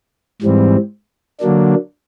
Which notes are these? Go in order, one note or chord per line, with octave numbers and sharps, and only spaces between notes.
G#2 E3 G3 C4
D3 F#3 A#3 D4